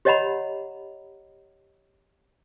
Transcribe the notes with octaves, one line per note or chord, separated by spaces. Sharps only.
G4 C#5 D#5 F#5 A#5 B5